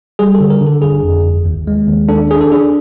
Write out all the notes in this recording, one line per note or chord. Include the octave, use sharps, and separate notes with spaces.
G3 G#4
A4
D3
A#4
D3
A4
G1 G#4
F2
G1
D#2
G#3
D#2
D4 A4
D4 G#4
A4
D4 G#4